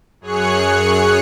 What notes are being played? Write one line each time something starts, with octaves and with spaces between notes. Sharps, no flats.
F#2 G#4 C#5 F#6 C#7